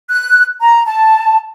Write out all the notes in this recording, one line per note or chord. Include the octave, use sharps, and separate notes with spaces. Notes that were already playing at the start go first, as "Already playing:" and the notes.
F#6
A#5
A5